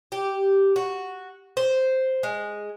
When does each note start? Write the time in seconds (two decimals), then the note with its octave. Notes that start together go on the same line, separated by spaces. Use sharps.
0.12 G4
0.76 F#4
1.57 C5
2.23 G#3